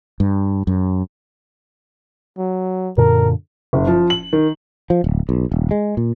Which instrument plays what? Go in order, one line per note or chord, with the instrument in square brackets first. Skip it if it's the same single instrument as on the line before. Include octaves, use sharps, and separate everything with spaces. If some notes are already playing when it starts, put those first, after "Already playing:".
[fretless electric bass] G2
F#2
[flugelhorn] F#3
[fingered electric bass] F#2 A#2 D3 [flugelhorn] A#4
[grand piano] F#1
F3
F#7
D#3
[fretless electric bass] F3
D1
B1
D#1
G#3
A#2